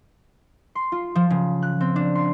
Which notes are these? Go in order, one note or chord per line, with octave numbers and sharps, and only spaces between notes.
C6
F4
F3
C#3
F#6
C4
D4
C6